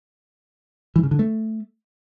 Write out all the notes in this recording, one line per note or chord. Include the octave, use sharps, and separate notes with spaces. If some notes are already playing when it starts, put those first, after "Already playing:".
E3
C#3
D3
A3